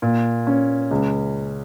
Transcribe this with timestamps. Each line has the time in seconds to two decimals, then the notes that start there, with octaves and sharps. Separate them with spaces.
0.02 A#2
0.47 C#4
0.91 C#2